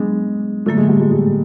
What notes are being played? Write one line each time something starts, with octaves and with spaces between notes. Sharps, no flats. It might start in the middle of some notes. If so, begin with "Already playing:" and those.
Already playing: F#3 G#3 B3 D4
D3 F#3 A3 A#3
G#3
G3
G#3
G#3